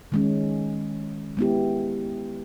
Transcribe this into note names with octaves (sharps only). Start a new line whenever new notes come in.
D#3 G#3 C#4
G#3 B3 E4 G4